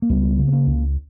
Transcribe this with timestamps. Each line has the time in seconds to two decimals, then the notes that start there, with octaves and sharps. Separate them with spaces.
0.02 A#3
0.10 C#2 G3 B3
0.39 C#3
0.48 B3
0.52 A#3 C#4
0.67 C#2